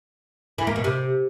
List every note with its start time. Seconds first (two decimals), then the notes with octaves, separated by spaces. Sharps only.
0.58 E3
0.67 A#3
0.76 B2
0.84 C3